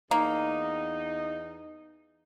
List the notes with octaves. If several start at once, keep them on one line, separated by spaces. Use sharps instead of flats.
E2 A#3 D#4